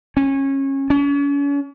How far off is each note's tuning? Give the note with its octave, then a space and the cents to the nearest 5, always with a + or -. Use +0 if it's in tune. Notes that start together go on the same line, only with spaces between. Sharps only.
C#4 -25
C#4 +40